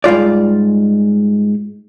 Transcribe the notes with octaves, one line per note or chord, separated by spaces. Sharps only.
G#2 G3 F4 D5